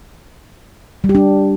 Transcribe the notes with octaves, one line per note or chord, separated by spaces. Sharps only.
G3
G4
D4